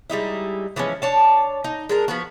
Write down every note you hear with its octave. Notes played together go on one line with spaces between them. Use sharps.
G3 G#3 D#4 E4
E3 F3 G#3 C#4
D4 C#5 A5
D#4
G#3 D4 A#4
F3 B3 F#4